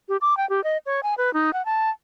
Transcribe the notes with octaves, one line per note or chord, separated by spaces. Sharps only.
G4
D6
G5
G4
D#5
C#5
G#5
B4
D#4
F#5
A5